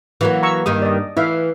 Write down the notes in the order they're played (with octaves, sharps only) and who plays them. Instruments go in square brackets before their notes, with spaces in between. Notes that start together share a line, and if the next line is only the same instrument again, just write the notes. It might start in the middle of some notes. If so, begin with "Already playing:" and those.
[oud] E3 F#3 A#3
[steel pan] A#5 C#6 E6
[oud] G2 D#3 A#3 [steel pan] D#6
[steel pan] D5 D#5
[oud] E3 [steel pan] E4 E5 F5